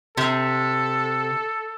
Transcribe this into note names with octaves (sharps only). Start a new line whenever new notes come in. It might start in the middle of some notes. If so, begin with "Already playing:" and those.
C3 A4